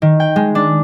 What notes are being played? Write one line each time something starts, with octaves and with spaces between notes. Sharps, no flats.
D#3
G5
G#3
D4